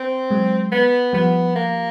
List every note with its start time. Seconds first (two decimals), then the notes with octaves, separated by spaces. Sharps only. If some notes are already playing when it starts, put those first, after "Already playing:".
Already playing: C4
0.31 F#3 G#3
0.72 B3
1.13 F3 G3 B3
1.56 A#3